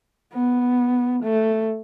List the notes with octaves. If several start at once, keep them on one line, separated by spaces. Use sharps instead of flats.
B3
A3